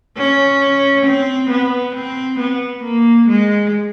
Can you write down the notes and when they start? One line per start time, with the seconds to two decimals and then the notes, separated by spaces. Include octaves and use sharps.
0.17 C#4
1.06 C4
1.51 B3
1.96 C4
2.40 B3
2.84 A#3
3.29 G#3